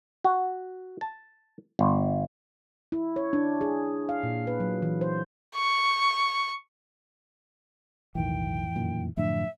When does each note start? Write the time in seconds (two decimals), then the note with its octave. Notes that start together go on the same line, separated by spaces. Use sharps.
0.24 F#4
1.01 A5
1.79 G1
2.92 E4
3.16 C#5
3.33 D4
3.61 G#4
4.09 F5
4.23 A#2
4.47 B4
4.60 F#3
4.82 E3
5.01 C5
5.56 C#6
8.15 B1 F2 A2 D#3 E3 G5
8.75 F#2 A#2 D#3
9.17 F#2 A2 D3 F3 A3 D4 E5